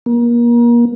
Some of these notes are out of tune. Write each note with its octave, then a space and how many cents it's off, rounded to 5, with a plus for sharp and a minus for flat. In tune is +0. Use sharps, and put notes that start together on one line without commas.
A#3 +30